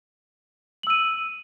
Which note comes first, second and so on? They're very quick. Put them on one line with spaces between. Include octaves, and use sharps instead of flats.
F#7 E6 D#7